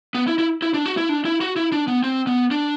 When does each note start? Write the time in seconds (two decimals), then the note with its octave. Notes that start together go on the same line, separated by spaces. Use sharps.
0.14 B3
0.27 E4
0.38 E4
0.62 E4
0.74 D4
0.86 F#4
0.97 E4
1.09 D4
1.25 E4
1.41 F#4
1.56 E4
1.72 D4
1.88 B3
2.04 C4
2.27 B3
2.51 D4